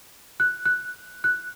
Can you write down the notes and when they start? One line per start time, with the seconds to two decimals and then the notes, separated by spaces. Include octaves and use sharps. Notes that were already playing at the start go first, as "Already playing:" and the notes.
0.40 F#6
0.65 F#6
1.24 F#6